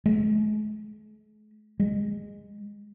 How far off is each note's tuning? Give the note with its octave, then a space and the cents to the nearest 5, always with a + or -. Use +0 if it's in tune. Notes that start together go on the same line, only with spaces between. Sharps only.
G#3 +45
G#3 -20